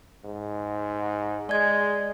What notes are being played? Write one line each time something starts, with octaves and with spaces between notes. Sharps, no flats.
G#2
G#3 D5 G#6